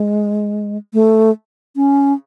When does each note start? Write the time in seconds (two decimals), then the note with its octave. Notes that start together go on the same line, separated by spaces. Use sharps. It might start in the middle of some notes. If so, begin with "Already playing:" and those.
Already playing: G#3
0.94 A3
1.76 C#4